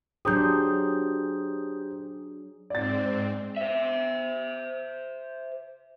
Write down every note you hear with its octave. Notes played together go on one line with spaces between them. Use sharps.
F#3 D4 G4 G#4 C5 A#5 D#6 G6
G#2 C4 D5 A6
C5 E5